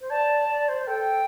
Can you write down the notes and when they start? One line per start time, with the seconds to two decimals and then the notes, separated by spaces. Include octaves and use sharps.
0.01 C5
0.10 D5 A5
0.49 D5
0.69 C5
0.87 A4 G5